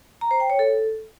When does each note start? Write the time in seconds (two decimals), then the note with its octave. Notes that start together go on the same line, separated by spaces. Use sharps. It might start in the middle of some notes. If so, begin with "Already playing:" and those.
0.21 A#5
0.31 C5
0.40 G5
0.50 C#5
0.59 A4